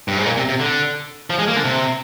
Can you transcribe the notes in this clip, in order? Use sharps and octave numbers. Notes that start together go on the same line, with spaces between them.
G2
G#2
A#2
C3
C3
D3
F3
G#3
A#3
D3
C3